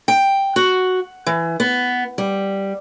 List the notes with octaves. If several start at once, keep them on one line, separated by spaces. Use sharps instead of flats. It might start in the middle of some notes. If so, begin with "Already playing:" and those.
G5
F#4
E3
B3
G3